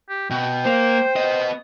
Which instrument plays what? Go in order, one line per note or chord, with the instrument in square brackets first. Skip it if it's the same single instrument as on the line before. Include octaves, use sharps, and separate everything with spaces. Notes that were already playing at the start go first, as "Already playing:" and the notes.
[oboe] G4
[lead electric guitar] B2 [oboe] G5
[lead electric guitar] A#3 [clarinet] C5
[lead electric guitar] B3 D#5